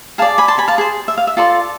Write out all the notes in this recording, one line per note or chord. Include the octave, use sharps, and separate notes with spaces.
G#4 D5 F5 A5
G#5 B5
A5 C6
G#5 B5
F5 A5
G#4 C5
E5
F5
E5
F4 A4 D5 A5 C6